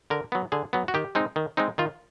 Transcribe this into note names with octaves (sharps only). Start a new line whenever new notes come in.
D3 A#4
F#3 B3
D3 G#4
F#3 B3
F#4
D#3 G4
G#3 C4 D#4
D#3
G#3 C4 D#4
D#3 F4